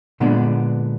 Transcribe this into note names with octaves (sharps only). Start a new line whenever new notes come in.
A#2 D3 G#3 B3 D4